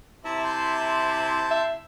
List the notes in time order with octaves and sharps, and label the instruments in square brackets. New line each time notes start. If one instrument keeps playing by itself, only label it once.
[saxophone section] C3 E4 [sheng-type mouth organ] E5 A5 A#5
[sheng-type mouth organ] A5 C6 G6
[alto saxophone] E5